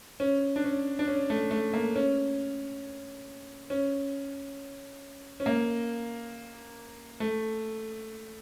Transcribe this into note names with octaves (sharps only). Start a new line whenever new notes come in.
C#4
D4
C#4
D4
C#4
A3
A3
A#3
C#4
C#4
C#4
A#3
A3